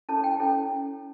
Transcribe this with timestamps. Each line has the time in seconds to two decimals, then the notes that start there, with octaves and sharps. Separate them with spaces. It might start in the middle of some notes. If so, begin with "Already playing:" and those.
0.09 C#4 E4 A4 C#5 A5
0.24 G5
0.39 C#4 E4 A4 C#5